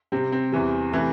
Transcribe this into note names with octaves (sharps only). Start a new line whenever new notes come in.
C3 G3 C4
C4
E2 E3 G3
C3 E3 A3